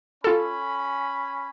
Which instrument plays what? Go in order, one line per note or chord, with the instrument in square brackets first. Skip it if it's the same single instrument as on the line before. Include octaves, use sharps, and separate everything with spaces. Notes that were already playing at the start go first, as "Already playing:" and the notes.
[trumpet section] C#4 B5 [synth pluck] F4 A4